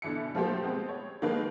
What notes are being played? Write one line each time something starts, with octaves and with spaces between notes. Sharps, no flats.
B2 D3 E3 E5 C#7
F3 F#3 A3 A#3 G4 C5
G#3 B3 C4
C#5
D#3 F3 G#3 A#3 A4 B4